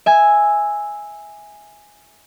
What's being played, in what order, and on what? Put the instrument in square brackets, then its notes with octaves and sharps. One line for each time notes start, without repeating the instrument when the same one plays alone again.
[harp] E5 G#5